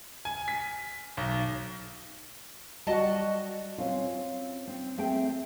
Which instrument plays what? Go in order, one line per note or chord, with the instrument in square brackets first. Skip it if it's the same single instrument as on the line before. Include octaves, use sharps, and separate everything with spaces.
[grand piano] G#5
B6
B1
[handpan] G3 F#4 F#5 [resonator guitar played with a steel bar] D#5 A5
[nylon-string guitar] C4 C#4 F4
C4
A3 C4 G#4 E5 G5